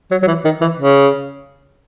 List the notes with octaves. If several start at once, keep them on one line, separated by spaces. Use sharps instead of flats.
F#3
F#3
E3
D#3
E3
C#3